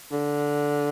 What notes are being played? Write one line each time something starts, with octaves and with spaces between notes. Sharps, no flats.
D3